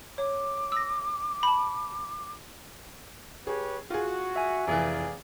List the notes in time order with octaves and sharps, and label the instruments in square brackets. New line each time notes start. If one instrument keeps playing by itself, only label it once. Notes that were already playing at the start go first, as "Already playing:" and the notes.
[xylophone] C#5 [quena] D6
[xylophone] E6 A#6
A5 B5
[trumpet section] G4 B4 C#5 [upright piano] G#4
[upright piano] F4 G#4 [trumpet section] F#4
[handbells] E5 G#5
[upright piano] F1 E3 [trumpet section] G#4 D5 F5